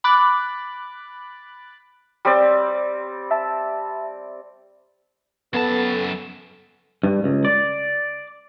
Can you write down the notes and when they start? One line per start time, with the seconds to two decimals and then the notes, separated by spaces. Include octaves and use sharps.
0.04 B5 D6 F#6 A6
2.25 G3 C4 D5
3.31 E5 A5
5.54 F#2 B3 A4 A5
7.03 G2
7.24 C#2
7.45 D5